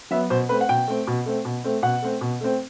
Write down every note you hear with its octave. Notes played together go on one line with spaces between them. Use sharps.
F#3 B3 E5
B2 C5
A3 C4 B4
F#5
B2 G5
A3 C4
B2
A3 C4
B2
A3 C4
B2 F#5
A3 C4
B2
A3 C4